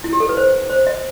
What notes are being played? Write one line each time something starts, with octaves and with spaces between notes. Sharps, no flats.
E4
G4
A4
B4
C5
C5
D#5